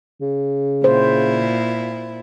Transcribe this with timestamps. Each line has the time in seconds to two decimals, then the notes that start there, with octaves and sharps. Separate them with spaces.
0.21 C#3
0.84 A#2 E4 C5